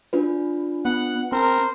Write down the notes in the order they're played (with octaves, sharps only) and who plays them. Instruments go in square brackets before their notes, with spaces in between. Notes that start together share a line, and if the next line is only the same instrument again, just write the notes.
[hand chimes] D4 F4 B4
[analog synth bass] B3 [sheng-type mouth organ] F#5 F#6
[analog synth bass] C4 [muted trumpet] A#4 [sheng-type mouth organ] C5